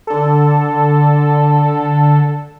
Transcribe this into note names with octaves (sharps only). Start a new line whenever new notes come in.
D3 A4